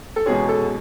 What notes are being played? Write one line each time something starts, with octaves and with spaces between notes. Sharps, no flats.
A4
E2 B2 G#3 C#4 G#4
A4